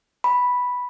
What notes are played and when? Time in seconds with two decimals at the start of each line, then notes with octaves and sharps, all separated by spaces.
0.24 B5